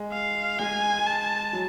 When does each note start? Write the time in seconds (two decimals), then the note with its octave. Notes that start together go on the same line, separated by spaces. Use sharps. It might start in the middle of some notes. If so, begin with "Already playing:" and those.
Already playing: G#3
0.12 F5
0.58 G#3 G#5
1.06 A5
1.53 F#3